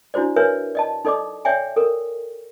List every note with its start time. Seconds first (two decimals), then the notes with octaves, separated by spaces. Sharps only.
0.14 D4 E4 F#4 C5 D5
0.36 A#4 B4 C#5 E5 G#5
0.75 D5 D#5 A5
1.05 D#4 A4 D5 D#5 D6
1.45 C#5 D5 E5 G5 G#5
1.76 A4 A#4